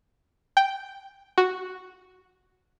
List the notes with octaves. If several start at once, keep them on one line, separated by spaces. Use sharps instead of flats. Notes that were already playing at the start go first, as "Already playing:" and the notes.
G5
F#4